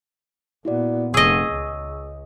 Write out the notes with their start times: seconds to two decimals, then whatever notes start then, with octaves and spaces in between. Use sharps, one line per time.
0.65 A#2 B3 E4 F#4 D5
1.14 F1 G#4 D#5 C#6 E6
1.52 C#2